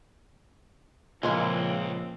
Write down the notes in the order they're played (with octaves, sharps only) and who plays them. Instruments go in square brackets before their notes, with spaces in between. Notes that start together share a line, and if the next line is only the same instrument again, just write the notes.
[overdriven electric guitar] C#2 [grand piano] A#2 [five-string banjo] E3 G#3 A#4 [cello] F3 C4